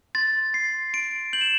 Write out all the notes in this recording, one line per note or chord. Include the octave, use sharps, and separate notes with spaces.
C6 A6
C6 C7
C6 D7
G6 F#7
E7